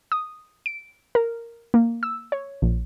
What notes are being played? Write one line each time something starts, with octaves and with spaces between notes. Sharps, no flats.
D#6
D7
A#4
A#3
E6
C#5
A#1